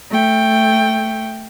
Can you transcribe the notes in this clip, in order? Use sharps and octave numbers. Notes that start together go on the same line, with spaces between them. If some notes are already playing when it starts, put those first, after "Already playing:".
A3 G5